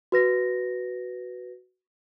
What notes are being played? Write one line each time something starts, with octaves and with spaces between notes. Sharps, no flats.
F#4 B4 A#6